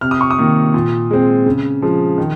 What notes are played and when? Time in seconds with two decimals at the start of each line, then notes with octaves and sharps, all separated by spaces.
0.01 C3 F6
0.11 D#6
0.21 C#6
0.31 D#6
0.38 D#3 A#3
0.74 A#2
1.11 G#3 C4
1.46 C#3
1.82 F3 G#3
2.18 D#3